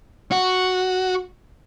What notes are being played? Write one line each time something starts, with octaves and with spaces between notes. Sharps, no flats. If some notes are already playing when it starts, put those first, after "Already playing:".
F#4